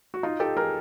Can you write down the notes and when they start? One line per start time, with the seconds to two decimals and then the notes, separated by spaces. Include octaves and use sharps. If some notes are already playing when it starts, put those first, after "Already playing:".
0.14 F#4
0.23 D#4 F4
0.40 G4 A4
0.57 G#4 A#4